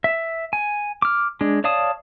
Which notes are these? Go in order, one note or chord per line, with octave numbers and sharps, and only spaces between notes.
E5
G#5
D6 F6
G#3 D4
C#5 D5 F5 A5 D#6